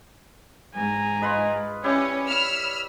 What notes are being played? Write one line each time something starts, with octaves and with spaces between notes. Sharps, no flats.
G#2 G#5 A#5
F4 B4 D#5
C#4 E4 G4 C#5 D5
B5 E6 F6